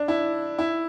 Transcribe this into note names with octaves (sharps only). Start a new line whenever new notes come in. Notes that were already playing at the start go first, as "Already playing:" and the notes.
Already playing: D4
E4
E4